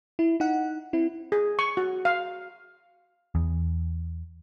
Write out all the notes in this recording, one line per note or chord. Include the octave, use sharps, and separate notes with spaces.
E4
D#4 F#5
C4 E4
G#4
C#6
F#4
F5
E2